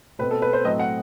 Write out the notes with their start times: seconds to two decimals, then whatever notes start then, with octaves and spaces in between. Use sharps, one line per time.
0.19 B2 A3 C4 B4
0.31 A4
0.42 B4
0.53 C5
0.64 A2 F#3 A3 C4 D#5
0.79 F#5